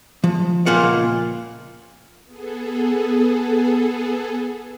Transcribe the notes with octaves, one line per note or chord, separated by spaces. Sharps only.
F3
C#2 A#2 A#3 F4 F#5
B3 G#4 A4